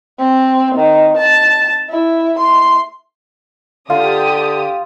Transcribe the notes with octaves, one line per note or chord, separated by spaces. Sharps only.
C4
D#3
A5
E4
C6
D3 F4 G4 F5 D#6